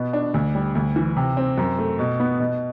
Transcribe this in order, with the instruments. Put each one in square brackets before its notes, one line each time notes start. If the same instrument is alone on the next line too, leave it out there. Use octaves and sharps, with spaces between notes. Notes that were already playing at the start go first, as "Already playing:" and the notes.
Already playing: [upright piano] B2 B3
D4
D2
G3
D2
E3
C3
C4
F#2
A3
B2
B3
B2